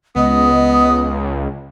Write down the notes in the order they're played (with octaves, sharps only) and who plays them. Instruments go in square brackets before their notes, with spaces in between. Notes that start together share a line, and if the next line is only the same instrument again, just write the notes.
[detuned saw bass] C#2 [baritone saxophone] B3 [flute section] D#5 D#6